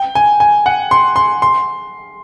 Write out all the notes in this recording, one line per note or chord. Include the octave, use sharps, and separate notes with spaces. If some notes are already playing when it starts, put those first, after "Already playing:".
Already playing: G5
G#5
G#5
F#5
C6
C6
C6